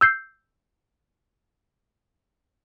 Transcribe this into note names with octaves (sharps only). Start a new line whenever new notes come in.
E6 G6 C7